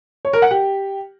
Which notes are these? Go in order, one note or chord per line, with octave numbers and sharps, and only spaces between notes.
C#5
A#4
F#5
G4